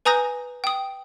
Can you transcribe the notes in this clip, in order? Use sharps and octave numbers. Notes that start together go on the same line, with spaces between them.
B4 G#5 A#5 D#6 G6 A#6
G5 D#6